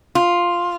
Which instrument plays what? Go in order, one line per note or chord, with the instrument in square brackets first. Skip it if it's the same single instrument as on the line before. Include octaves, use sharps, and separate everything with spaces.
[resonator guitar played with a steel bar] F4